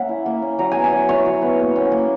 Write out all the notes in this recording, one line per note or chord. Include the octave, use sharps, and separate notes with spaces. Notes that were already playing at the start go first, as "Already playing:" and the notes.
Already playing: A#3 C#4 E5 F#5
E4
A#3
C#4
F#3 A#5
B3 G#5
G#5
F#3
E4 C#5
F#3
B3
A#3
C#4
A#3